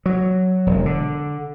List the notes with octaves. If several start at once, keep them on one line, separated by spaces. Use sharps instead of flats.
F#3
E1
D3